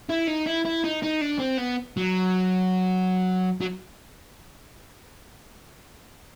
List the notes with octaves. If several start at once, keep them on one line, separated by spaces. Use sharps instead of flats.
E4
D#4
E4
E4
D#4
D#4
D4
C4
B3
F#3
F#3